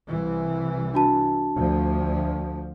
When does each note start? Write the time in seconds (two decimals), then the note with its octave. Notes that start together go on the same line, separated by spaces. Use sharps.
0.10 C2 E3
0.94 D4 F#4 A5
1.56 D2 F3